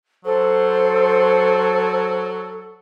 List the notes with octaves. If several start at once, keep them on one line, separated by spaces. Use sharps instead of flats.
F#3 A4 C5